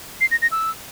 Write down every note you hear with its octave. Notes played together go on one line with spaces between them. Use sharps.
C7
A#6
A#6
E6